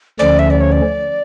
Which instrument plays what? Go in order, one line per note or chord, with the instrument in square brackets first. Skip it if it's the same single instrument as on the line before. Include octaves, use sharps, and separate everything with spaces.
[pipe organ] D2 D3 F3 C#4 [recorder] D5
[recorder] E5
D5
C#5
D5